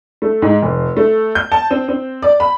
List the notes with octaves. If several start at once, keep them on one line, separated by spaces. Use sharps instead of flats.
A3
G#2
F1
A3
G6
A5
C4
C4
D5
B5